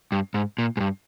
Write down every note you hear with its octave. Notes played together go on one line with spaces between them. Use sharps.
G2
G#2
A#2
G#2
G2